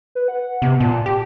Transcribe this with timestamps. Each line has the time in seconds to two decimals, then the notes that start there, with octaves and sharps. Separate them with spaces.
0.15 B4
0.28 F#5
0.62 C3 B3
0.80 A#2 A5
1.06 G4 G5